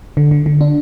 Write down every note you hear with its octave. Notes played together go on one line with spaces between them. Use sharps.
D3
D3
D3
D4